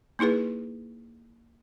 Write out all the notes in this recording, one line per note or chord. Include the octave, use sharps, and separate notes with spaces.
A#3 D#4 E4 G#4 B4